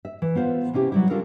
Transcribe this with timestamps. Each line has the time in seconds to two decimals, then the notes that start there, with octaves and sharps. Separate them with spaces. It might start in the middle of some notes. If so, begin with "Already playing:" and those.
0.05 E5
0.22 E3
0.35 B3 F4 C5 F5
0.74 C3 C#4 E4 G4
0.92 F#3 G3 E4
1.10 C#4 D4 F4 A4 A#4